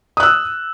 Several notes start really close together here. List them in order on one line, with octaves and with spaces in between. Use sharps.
D#6 F#6 E6